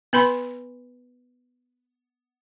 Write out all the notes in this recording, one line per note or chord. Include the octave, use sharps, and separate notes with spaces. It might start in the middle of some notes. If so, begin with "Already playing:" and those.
B3 B4 B5 C6